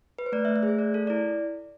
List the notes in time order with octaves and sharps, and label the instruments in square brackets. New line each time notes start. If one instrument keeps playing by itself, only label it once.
[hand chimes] B4
C5
A3 D5
E5
A3
E5
G#4 C5
A3 D5
A4
D5
E4